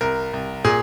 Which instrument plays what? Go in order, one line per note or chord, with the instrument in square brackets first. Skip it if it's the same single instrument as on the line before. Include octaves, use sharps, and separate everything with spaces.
[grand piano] C2 A#4
C2
A#2 G#4